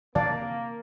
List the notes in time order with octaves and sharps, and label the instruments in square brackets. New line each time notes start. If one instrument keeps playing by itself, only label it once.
[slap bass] C3 D#3 E3 [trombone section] A#3 [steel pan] D5 F5 A5